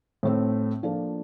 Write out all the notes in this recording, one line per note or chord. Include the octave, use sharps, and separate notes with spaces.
A2 A3 C4
F3 A#3 D4 F4 A4